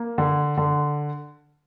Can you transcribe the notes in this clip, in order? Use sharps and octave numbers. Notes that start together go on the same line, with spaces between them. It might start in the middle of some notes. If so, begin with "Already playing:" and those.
Already playing: A#3
D3
D3